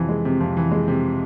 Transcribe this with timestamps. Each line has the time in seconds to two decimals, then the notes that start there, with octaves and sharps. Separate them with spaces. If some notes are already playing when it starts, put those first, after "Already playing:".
Already playing: F2 C3 E3
0.09 G#3
0.25 C3
0.40 F2
0.57 E3
0.71 G#3
0.88 C3